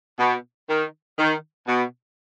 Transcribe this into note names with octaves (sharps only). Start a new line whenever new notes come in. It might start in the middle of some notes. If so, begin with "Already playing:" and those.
B2
D#3
D#3
B2